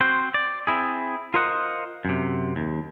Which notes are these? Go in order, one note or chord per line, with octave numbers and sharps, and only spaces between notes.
C4 F#4 C5
D5
C4 E4 G#4
F4 A#4 C5 D#5 F#5
F#2 C3
D#2